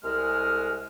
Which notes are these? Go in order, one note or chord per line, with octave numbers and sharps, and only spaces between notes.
C2 G#3 F6